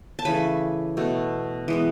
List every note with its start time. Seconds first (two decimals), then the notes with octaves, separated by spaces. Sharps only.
0.19 A5
0.25 C#3 E3 A3 G#5 B5
0.97 B2 A3
1.68 E3 G#3 B3